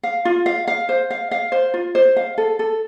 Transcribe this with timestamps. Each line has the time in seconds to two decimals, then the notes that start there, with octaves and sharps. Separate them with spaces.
0.03 F5
0.25 F4
0.46 F5
0.67 F5
0.89 C5
1.10 F5
1.31 F5
1.52 C5
1.74 F4
1.95 C5
2.16 F5
2.38 A4
2.59 A4